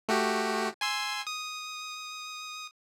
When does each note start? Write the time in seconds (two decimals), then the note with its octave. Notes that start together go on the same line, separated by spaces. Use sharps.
0.09 A3 F#4 G4
0.81 G#5 C6 E6
1.27 D#6